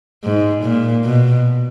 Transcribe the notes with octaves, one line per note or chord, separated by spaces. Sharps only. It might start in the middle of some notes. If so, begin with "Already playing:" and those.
G#2
A#2
B2